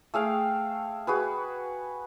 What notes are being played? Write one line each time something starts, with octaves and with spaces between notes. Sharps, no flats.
A3 G#4 F5 G5
F#4 G#4 B4